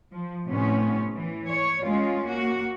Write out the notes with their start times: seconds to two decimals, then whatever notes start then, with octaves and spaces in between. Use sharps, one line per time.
0.12 F3
0.46 A2 C3 B3 C#4
1.14 E3
1.46 C#5
1.84 G#3 C#4 F4
2.25 A#3 F#4